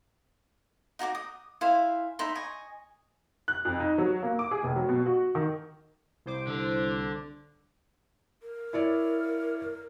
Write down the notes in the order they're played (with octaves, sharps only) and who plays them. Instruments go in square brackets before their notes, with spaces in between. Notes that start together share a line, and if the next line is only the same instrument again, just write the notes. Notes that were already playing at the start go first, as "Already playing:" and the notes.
[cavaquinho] D#4 F#4 G#5 D6
D#6
E4 C5 F5 G#5
D#4 E5 B5 C6
D#5 G#5 C#6
[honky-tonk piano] F#6
F2
D#4
F#3
A#3
D6
G#4
F1
F#3
B2
F#4
D#3
[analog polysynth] C2 C5 D6
[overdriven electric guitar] D3
[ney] A#4
[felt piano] E4 C#5 D5